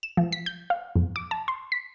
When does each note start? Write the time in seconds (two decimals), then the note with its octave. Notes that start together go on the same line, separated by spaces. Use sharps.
0.03 E7
0.17 F3
0.32 B6
0.46 G6
0.70 F5
0.95 F2
1.16 D6
1.31 A5
1.48 C6
1.72 B6